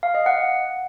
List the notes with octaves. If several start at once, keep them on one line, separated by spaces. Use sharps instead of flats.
F5
D#5
F#5